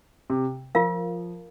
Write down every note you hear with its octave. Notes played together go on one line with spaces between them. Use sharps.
C3
F3 F4 A#4 F5